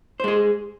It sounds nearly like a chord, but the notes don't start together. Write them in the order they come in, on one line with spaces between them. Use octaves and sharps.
C5 G#3 G#4